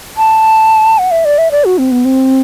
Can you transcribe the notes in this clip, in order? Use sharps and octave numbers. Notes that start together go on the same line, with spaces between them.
A5
F#5
E5
D5
E5
D5
F#4
C4
B3
C4